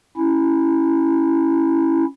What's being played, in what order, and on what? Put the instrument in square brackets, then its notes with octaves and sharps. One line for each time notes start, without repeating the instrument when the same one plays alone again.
[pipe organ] C#4 E4